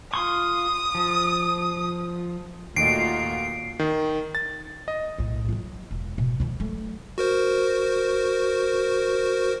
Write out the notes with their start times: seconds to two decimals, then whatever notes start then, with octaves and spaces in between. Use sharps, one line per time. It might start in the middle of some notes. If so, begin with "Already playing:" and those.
0.14 F4 C6 C#6 D#6
0.95 F3
2.76 D#2 A#2 A3 F4 F#4 D#5 C7 D7
3.79 D#3
4.35 A6
4.88 D#5
5.18 B1 A2
5.49 F#3 F4
5.91 E1
6.18 B2
6.40 D#3 F3
6.60 F#3 A3
7.18 F#4 A#4 C5